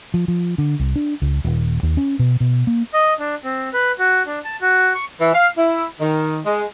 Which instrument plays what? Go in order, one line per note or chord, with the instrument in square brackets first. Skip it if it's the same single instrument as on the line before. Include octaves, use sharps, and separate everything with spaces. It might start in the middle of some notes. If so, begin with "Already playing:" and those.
[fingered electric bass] F3
F3
D3
C2
D4
C#2
D#1
D#2
C#4
B2
B2
A#3
[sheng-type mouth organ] D#5
D4
C4
B4
F#4
D4
A5
F#4
C#6
[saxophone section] E3
F5
E4
D#3
G#3